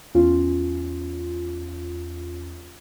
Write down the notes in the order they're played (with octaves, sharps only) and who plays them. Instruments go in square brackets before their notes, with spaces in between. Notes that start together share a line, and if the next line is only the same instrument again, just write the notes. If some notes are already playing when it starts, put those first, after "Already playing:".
[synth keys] E2 C#4 F4